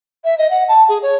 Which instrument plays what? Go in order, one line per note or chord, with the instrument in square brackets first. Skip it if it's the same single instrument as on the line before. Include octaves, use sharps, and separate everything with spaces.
[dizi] E5
D#5
F#5
A5
G#4
C#5